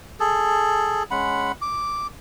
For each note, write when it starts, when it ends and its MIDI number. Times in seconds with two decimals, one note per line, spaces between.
0.20 1.03 68
0.20 1.03 69
1.11 1.52 56
1.11 1.52 61
1.11 1.52 78
1.11 1.52 83
1.62 2.07 86